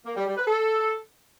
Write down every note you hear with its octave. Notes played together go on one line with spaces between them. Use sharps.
A#3
G3
G3
B4
A4